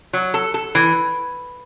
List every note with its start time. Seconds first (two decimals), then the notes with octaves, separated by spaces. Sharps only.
0.13 F#3
0.34 A4
0.54 A4
0.75 E3